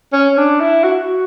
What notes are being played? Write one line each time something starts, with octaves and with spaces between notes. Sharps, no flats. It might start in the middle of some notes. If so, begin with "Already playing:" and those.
C#4
D4
E4
F#4
F#4